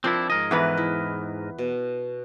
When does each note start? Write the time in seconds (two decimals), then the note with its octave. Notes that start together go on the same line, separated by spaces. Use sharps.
0.04 F3 C4 D4 E4 A#4 C6
0.30 G#2 A#4 D#5 G#5
0.51 E2 E3 B4 C#5
0.77 E4
1.59 B2